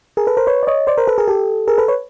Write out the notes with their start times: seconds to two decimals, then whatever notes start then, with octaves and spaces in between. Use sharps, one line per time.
0.17 G#4 A#4
0.27 A4 B4
0.37 A#4 C5
0.47 B4 C#5
0.63 D5
0.67 C#5 D#5
0.87 C5 D5
0.97 A#4 C5
1.07 A4 B4
1.18 G#4 A#4
1.28 G4 A4
1.68 G#4 A#4
1.78 A4 B4
1.88 B4 C#5